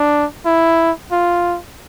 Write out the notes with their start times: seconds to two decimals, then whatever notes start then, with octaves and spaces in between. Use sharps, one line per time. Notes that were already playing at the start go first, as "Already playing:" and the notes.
Already playing: D4
0.46 E4
1.12 F4